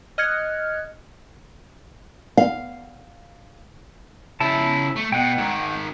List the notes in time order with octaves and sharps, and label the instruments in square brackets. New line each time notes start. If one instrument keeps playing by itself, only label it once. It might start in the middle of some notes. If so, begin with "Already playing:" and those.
[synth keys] D#5 F6 F#6 G#6 C#7
[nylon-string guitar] F5
[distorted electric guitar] C#3 E5 [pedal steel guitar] E4 A5
[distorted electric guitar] A3
[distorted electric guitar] B2 [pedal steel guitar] F#5 G5
[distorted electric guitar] G#2 D#3